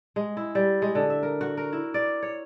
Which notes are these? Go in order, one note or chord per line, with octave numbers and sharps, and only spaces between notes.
G#3
E4
G3
G#3
D3
E5
A#4
F#4
A#4
E4
D5
C#5